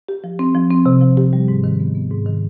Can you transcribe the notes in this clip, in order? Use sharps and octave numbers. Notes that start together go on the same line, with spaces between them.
G4
F3
C4
F3
C4
C3
F3
G4
G3
G#2
D#3
B3
B3
G#2
D#3